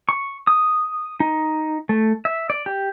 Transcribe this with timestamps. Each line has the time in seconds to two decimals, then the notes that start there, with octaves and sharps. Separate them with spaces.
0.09 C#6
0.47 D#6
1.20 D#4
1.89 A3
2.25 E5
2.50 D5
2.66 G4